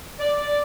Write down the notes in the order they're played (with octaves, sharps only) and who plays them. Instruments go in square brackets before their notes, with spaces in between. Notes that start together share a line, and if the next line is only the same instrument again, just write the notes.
[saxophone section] D5